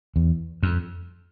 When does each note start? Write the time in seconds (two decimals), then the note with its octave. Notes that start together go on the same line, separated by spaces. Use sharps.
0.16 E2
0.63 F2